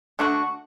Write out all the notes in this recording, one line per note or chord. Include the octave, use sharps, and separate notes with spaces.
D3 A3 D4 F#4